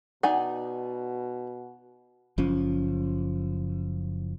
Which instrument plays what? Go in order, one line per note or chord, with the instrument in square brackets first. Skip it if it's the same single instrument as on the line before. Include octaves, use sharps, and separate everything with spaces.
[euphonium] B2 [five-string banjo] D#4 D5 G#5 [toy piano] F#5
[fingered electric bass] F#1 F3 C#4